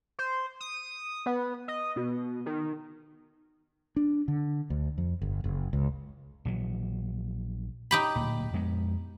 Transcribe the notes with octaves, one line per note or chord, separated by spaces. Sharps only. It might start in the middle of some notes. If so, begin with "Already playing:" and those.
C5
D#6
B3
D#5
B2
D#3
D4
D3
D2
F2
G1
F#1
C#2
A#1 E3 F#3
D#4 G4 B5
D1 A#2
F2 G#3 B3